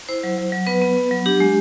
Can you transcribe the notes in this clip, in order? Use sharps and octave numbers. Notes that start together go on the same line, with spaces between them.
E4 C5
F#3
F#3
F#3
B3 B4
B3
B3
F#3
D4 G4
G#3